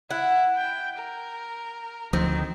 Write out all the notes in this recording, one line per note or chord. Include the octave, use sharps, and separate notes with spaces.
E4 F#5
G5
A#4
D2 D#3 F3 C4